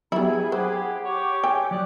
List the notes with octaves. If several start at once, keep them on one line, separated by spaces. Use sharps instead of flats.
F#3 B3 E4 G4 G#4 B5
G4 C5 F#5
G4 C#5 D6
G5 G#5
F#3 D5 D#6 F#6